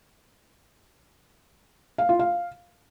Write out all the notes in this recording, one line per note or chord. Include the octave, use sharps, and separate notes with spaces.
F5
F4
F5